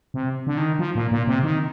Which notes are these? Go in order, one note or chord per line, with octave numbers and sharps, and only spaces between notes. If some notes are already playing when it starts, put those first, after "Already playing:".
C3
D3
D#3
F3
A#2
A#2
C3
D#3